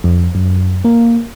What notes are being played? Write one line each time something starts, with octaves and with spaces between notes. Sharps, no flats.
F2
F#2
A#3